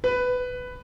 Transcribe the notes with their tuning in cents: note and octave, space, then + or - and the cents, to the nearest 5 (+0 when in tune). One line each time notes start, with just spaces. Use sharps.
B4 +10